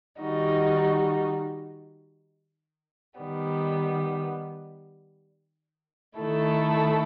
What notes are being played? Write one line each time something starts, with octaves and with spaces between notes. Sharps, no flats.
D#3 G3 D#4 F#4
D#3 G3 B3
D#3 A3 E4 A4